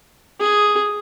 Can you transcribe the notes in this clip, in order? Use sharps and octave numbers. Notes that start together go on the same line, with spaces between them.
G#4